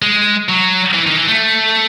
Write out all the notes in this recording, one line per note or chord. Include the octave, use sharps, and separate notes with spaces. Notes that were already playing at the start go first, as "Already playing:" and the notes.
G#3
F#3
E3
D#3
E3
A3